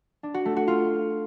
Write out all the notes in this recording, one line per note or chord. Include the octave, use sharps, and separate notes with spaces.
D4
F#4
A3
F#4
F4